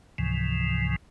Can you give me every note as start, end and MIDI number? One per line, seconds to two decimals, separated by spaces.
0.18 0.96 37
0.18 0.96 44
0.18 0.96 48
0.18 0.96 52
0.18 0.96 53